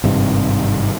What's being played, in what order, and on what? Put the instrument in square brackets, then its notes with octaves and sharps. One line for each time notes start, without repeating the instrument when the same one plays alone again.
[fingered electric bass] G#1 G2 C3